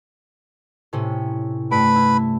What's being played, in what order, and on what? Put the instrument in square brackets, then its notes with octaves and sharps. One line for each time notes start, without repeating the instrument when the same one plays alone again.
[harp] A2 C3 C#4
[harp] G2 [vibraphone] A3 [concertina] B4 B5
[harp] E4